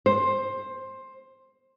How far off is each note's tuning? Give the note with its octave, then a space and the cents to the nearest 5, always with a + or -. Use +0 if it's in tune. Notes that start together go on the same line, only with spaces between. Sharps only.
C5 +15